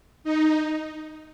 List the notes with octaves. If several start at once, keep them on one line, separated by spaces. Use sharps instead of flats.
D#4